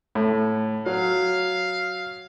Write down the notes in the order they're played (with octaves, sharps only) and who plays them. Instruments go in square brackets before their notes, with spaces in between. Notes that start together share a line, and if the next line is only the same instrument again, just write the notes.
[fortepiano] A2
[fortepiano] F#3 [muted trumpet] F5